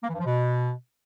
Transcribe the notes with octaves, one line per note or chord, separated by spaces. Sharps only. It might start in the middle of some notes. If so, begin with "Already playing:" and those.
A#3
E3
G2
F3
B2